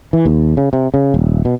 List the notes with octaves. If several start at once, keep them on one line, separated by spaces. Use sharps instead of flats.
E3
D#2
C#3
C3
C#3
D#1
B2